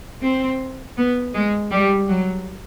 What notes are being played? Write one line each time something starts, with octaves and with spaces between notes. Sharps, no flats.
C4
B3
G#3
G3
F#3